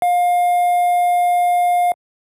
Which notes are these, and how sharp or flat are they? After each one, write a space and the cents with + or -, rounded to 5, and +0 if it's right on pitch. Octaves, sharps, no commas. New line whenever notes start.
F5 +25